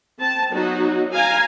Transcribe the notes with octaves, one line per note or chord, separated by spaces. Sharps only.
C4 A5
F#3 B3 D#4 F#4
F5 G#5 A#5